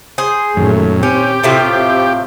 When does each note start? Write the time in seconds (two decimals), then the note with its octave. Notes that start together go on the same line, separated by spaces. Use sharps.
0.18 G#4 C5
0.57 F#2 A#2 D#3 A3
1.03 C4 C#4 G4
1.44 A2 C3 F4